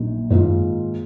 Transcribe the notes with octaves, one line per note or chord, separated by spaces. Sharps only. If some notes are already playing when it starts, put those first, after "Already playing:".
Already playing: A#1 A#2 F#3 A#3 D#4
G#2 D#3 A#3 F4